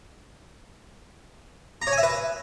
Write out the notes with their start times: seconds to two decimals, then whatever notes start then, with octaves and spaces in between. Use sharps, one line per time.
1.82 A#5
1.87 C#5
1.92 G#5
1.98 E5
2.03 B4